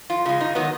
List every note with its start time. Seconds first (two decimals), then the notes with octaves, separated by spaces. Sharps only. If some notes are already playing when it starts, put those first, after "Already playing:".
0.10 F2 F4
0.26 C#3 G#3
0.40 G#2 D#4
0.55 D#3 F#3 B3